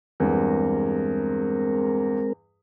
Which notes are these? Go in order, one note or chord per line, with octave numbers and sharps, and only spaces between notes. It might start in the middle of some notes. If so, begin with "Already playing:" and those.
E2 G2 G#3 C4 A#4